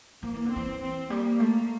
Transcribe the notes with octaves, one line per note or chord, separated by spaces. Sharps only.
F3 A#3
E3
D3
E3 C4
C4
G3 A#3
A3